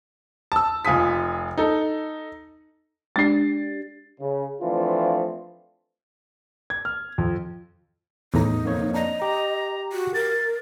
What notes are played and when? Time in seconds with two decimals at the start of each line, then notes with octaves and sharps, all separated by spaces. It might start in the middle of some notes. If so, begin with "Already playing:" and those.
0.52 A5 E6
0.85 F1 F4 G#5 D#6 B6
1.58 D#4 A4
3.16 G#3 D4 G4 A6 C7
4.21 C#3
4.62 E3 F3 A3 C4 D4 F4
6.70 G#6
6.85 F6
7.18 F2
8.34 E2 A2 D#4 A#5
8.64 F2 A#3 C#5
8.94 D4 D#5 A#5
9.22 G4 A#5
9.93 F#4
10.14 A#4 A6